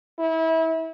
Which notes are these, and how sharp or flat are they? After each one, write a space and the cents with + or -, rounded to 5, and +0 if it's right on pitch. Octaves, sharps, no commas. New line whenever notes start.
E4 -30